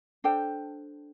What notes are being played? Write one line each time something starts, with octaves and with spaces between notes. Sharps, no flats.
D4 A4 C5 G5